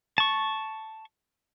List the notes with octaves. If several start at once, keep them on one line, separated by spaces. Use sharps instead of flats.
A5 C#6